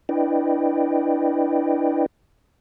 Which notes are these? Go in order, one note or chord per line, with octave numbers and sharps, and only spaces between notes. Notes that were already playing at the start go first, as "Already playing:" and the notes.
D4 E4 B4 D5 D#5 G5